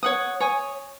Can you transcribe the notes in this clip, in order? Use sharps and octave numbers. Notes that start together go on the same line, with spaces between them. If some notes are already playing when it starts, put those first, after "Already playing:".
C#5 F#5 D#6
C#5 G#5 D#6